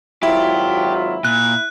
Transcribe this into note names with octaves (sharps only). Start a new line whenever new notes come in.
G#1 F#3 E4 F4 G4
A#2 F#6